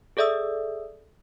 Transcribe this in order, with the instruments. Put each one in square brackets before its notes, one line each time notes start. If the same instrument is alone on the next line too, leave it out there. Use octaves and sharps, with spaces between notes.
[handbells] G#4 A4 D5 E5 D#6 E6